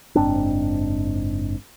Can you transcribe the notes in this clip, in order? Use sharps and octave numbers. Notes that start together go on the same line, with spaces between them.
F#1 G#2 C4 D4